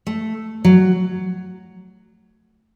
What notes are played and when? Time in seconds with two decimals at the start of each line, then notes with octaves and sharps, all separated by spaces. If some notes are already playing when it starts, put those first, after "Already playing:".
0.07 A3
0.65 F#3